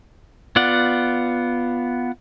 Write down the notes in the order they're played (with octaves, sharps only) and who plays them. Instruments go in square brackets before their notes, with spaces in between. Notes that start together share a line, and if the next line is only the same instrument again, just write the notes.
[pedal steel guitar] B3 F4 D5 F#5